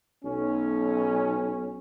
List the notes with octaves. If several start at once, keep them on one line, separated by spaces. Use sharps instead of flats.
B1 C#4